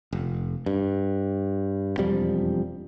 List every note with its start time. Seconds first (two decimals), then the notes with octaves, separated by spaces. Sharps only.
0.13 F1
0.66 G2
1.98 E1 F2 F3 G3